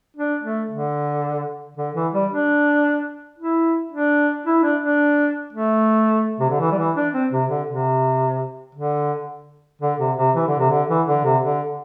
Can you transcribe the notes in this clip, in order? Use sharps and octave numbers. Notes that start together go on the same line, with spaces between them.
D4
A3
D3
D3
E3
G3
D4
E4
D4
E4
D4
D4
A3
C3
D3
E3
G3
E3
D4
C4
C3
D3
C3
D3
D3
C3
C3
E3
D3
C3
D3
E3
D3
C3
D3